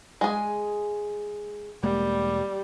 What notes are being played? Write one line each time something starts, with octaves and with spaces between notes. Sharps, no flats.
G#3 G#4
E1 G3 G#3 A#3